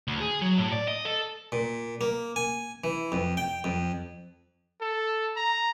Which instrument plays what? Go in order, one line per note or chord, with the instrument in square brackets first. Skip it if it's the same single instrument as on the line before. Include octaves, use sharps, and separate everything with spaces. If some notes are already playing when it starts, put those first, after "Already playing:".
[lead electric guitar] D2
G#4
F#3
A2
D5
D#5
A4
[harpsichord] A#2
A#3
G#5
E3
F2
G5
F2
[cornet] A4
A#5